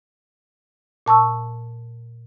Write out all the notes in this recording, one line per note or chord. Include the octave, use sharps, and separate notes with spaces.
A#2 A5 C#6 E6